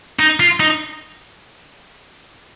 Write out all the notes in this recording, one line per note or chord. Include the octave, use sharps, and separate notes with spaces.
D#4
F4
D#4